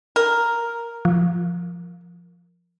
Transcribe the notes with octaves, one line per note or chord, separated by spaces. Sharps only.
A#4
F3